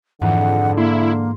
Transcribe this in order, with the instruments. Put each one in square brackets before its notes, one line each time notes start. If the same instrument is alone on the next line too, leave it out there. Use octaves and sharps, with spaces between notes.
[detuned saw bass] F2 [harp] G#2 E3 [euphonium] D3 [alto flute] F#5
[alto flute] A#3 [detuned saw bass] E4 [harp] C6